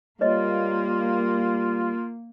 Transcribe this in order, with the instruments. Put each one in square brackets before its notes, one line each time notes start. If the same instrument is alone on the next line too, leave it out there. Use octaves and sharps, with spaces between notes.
[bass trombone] G3 [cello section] A#3 [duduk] F4 [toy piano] B4 C#5 D#5